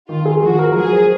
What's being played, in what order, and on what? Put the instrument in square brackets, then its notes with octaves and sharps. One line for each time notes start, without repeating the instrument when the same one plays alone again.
[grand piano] D#3 [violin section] F4
[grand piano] G#4
[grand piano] F3 [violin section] F#4
[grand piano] A#4
[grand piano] F#3 [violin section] G#4
[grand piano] C5